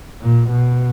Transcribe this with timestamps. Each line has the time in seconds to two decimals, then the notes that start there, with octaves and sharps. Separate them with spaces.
0.21 A#2
0.49 B2